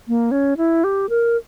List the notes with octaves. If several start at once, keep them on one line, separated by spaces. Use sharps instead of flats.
A#3
C#4
E4
G4
A#4